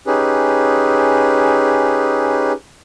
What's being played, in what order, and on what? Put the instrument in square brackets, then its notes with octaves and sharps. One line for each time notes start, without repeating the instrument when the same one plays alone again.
[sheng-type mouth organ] C#4 D#4 G4 G#4 B4